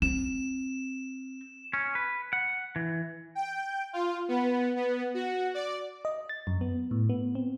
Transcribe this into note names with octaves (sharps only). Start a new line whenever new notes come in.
C4 E7
C#4
B4
F#5
E3
G5
F4
B3
B3
F#4
D5
D#5
A6
F#2
B3
A2
B3
C4